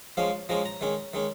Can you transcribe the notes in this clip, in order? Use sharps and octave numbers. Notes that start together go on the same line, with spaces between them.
F3 G#3 C#4 F5
F3 G#3 C#4 A#5
A#5
D#3 G#3 C#4
D#3 G#3 C#4